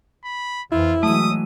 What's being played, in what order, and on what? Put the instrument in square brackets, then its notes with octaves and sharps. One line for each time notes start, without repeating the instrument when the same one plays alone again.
[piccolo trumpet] B5
[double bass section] F2 E3 [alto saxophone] E4 [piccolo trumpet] F4
[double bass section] E3 F#3 G#3 [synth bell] A3 D#7 [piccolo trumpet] D#6